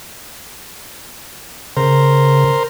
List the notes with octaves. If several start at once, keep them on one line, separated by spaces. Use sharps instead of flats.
C#3 A#4 C5